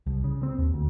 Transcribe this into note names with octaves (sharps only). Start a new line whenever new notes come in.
C2
C#3
C4
D#2
D2